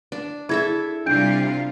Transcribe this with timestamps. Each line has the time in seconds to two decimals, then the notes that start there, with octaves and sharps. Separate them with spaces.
0.12 D4
0.49 E4 G#4 A4 E5 G#6
1.06 C3 G3 D4 F4 G6 D7